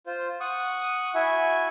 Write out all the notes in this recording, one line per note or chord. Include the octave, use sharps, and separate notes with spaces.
F4 C5
F#5 C#6 D#6
E4 F#4 E5 G#5 C#6